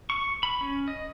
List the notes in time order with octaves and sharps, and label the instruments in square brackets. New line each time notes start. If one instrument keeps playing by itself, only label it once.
[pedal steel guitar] C#6
B5
C#4
D#5